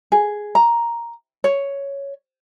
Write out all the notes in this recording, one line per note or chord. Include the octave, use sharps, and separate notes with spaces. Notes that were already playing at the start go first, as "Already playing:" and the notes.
G#4
A#5
C#5